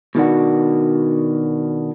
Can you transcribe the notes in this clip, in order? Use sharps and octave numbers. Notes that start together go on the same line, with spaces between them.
B2 D#3 D4 F#4